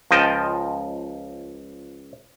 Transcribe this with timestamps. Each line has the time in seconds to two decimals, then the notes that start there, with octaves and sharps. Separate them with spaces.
0.11 C#2 F3 D#5 G5 A5